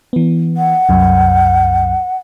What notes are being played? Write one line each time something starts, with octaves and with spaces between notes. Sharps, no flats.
E3 B3
F#5
C2 F#2